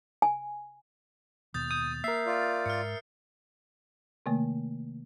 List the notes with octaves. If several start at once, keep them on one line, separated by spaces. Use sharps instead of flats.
G#5
D#2 B2 D#6 G6 A6
D#6 G6
A#3 A#4 E5 C7
F4 D5
G#2 F6 C#7
C3 D#3 A3 A#3